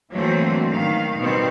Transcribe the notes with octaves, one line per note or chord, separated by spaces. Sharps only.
D3 E3 F#3 A3 A#3 C4
D#3 F5
B2 D#3 G3 B3 C4